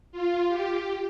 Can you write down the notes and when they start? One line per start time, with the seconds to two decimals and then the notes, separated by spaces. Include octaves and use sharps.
0.12 F4
0.48 G4